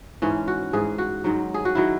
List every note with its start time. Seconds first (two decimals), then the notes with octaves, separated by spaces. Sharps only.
0.22 G#2 E3 C#4
0.48 F#4
0.73 G#2 E3 G#4
0.98 F#4
1.24 G#2 D#3 F#3
1.54 G#4
1.65 F#4
1.75 D#3 F#3 E4